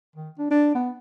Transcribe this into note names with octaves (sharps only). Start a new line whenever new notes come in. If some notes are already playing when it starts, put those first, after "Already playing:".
D#3
D4
D4
B3